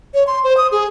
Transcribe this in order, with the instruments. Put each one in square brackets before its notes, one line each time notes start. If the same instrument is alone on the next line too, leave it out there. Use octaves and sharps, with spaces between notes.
[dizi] C#5
C6
C5
D#6
G#4